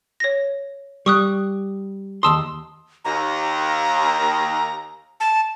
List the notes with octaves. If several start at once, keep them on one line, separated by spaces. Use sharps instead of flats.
C#5 A#6
G3 C#6 D#6 F#6
D#2 A5 C6 D#6 E6
D#2 A#5
A5